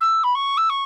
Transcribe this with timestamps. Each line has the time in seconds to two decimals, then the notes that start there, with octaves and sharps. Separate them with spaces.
0.01 E6
0.24 B5
0.35 C#6
0.57 E6
0.70 C#6